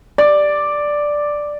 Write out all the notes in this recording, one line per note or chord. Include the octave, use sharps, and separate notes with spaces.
D5